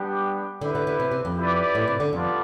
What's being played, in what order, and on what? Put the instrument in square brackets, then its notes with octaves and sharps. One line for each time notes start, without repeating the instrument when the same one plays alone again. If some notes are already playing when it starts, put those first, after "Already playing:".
Already playing: [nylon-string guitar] G3 [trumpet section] B3 D4 G4
[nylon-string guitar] D3 [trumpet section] E4 G4 B4
[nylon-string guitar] D3
D3
C3
C3
F2
[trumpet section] E4 G4 B4 D5
[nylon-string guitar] A2
C3
D3
[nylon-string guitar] F2 [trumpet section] G3 B3 F4 A4 D5